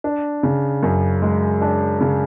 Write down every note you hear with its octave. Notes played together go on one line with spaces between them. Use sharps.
D4
C#3
F#2
G#3
D4
C#3